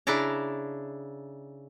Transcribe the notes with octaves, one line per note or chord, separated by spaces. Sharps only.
C#3 D4 E4 A5 A#5